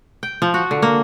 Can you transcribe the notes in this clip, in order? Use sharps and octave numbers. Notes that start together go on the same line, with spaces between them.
G5
F3
F#4
D3
A#3